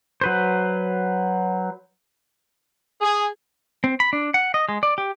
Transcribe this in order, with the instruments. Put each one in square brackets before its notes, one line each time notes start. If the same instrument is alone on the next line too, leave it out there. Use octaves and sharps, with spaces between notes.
[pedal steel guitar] F#3 B4 C5
[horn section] G#4
[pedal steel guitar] C4
B5
D4
F#5
D#5
G#3
D5
G4